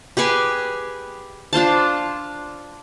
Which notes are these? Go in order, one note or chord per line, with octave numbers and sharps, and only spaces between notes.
G4 G#4 B4 G#5
D4 F4 C5 A5